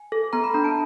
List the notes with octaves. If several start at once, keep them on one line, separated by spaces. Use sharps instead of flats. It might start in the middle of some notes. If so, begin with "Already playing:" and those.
Already playing: G#5
A4
B3 A#5
B5
D4 A#5
A5